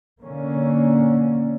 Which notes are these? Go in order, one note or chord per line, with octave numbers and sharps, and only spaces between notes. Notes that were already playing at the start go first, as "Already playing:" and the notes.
D3 A#3 C#4